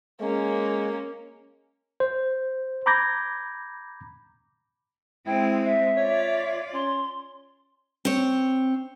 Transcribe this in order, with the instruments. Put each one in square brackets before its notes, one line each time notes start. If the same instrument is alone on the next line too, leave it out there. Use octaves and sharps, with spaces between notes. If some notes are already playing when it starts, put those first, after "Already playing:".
[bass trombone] G#3 [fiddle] A#3 C#4
[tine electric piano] C5
A#5 B5 D6 G6 G#6 A#6
[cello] G#3 C4 [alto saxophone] E4 [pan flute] G5
[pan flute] E5
[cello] F4 D5 [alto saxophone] C#5
[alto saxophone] C#4 [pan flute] C6
[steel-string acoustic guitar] C4 C#5